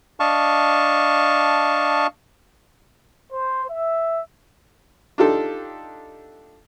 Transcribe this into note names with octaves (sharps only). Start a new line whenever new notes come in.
D4 D#5 F5 A5 C#6
C5
E5
D4 D#4 F4 G4 A4